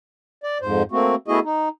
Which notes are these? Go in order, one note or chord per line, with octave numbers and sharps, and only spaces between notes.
D5
F2 G#2 C5
A3 A#3 C4 F#4
A3 B3 E4 F#4 G#4 D#5
D#4